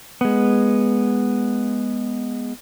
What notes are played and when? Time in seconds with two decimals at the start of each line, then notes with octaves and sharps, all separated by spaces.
0.21 G#3 B3